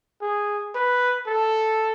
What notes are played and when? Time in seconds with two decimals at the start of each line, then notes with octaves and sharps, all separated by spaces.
0.21 G#4
0.75 B4
1.27 A4